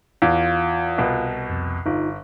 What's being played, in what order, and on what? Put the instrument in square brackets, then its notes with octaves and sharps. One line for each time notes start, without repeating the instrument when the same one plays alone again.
[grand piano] E2 [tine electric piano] F4 F5
[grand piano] C2 B2
[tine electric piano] F2
[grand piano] G1 [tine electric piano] D#4 F4